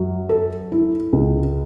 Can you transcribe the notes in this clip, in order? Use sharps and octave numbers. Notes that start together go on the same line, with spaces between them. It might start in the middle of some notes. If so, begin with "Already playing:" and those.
Already playing: F#2 F#3
A4
E4
C#2